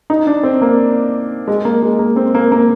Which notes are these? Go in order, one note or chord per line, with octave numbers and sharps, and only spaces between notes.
D#4
D4
C4
A#3
G#3
A#3
G#3
A#3
C4
A#3
A#3